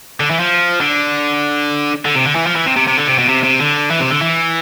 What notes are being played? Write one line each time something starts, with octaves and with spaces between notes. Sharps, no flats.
D3
E3
F3
D3
D3
C3
D3
E3
F3
E3
C3
C3
C3
D3
C3
B2
C3
C3
D3
E3
C3
D3
E3